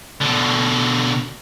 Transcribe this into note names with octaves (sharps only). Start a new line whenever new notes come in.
B2 D3